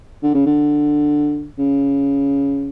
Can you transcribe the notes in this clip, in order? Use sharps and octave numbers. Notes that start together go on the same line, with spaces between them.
D3
C#3
D3
C#3